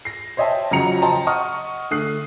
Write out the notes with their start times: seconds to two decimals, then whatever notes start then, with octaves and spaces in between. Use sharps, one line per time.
0.05 A#6 C7
0.37 C5 C#5 D#5 E5 G5 A5
0.71 F2 C#3 F#3 A#5 C#7 F7
1.02 C5 D#5 G5 A5 A#5
1.27 D#5 F#5 C#6 D#6 F6
1.91 D3 A3 D#6 F#6 C7